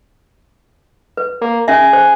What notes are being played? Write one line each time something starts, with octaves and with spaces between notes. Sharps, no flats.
B4
A#3
C#4 G#4 E5
C5